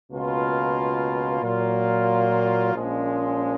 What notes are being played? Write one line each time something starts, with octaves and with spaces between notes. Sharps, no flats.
C#2 B2 A#3 F4
A#2 F#3 A#3 F4
A#1 A#2 F3 G#3 C#4